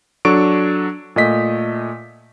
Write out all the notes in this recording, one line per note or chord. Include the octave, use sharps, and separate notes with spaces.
F#3 D4 A4 C#6 D7
A#2 A3 D#5 B6